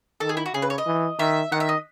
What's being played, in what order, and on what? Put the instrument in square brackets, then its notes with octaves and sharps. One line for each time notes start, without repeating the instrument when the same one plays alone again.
[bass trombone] D#3 [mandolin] A4
[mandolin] G#4
E4
F#4
[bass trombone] C#3 [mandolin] G#4
[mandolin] B4
C#5
D#5
[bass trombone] E3
[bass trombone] D#3 [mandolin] E5
[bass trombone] D#3 [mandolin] F#5
[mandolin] E5
D#5